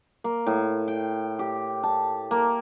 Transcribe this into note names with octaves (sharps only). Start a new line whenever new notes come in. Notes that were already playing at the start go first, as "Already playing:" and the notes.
A#3
A2
G5
G4
A5
A#3